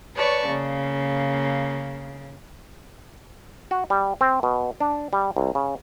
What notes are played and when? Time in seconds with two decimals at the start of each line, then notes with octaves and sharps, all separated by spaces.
0.16 B4 C#5 D5 A5 C#6
0.46 C#3 A#3
3.71 F#4
3.90 G3
4.21 C4
4.43 B2
4.80 D4
5.13 G3
5.37 C2
5.55 C#3